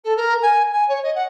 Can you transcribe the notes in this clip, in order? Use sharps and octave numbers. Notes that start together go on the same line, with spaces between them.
A4
A#4
G#5
G#5
C#5
D#5
F#5